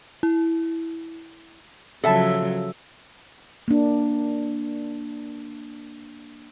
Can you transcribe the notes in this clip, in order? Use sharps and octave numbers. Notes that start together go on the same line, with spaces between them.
E4
C#3 F3 F#3 A4 E5 A5
A#3 D4